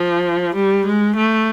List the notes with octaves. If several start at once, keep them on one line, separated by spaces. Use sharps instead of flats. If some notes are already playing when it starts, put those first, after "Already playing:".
Already playing: F3
G3
G#3
A3